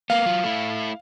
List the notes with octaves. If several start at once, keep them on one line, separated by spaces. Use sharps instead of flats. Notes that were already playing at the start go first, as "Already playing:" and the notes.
A#3 B3 F5
F#3 F4
A3 E4